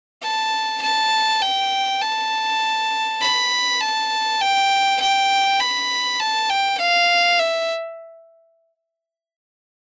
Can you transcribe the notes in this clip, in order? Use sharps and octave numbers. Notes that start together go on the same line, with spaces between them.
A5
A5
G5
A5
B5
A5
G5
G5
B5
A5
G5
F5
E5